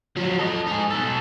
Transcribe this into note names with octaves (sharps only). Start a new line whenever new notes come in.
F3 F#3
A4 D#5
D#4 G#4
B2 A4